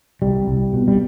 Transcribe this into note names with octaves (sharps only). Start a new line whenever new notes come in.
C2 G3
C2
B2
G3